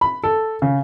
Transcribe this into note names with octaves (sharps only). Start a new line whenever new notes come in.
B5
A4
C#3